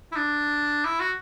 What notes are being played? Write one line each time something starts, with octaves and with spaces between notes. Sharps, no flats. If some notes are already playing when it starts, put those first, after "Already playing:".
E4
D4
E4
F#4